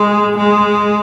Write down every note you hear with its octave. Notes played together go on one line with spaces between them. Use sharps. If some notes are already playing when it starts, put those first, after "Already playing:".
Already playing: G#3
G#3